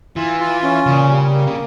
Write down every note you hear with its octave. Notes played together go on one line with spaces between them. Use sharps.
E3 F4
F4
C#4
A#2 C#3
G3
A#3
C#3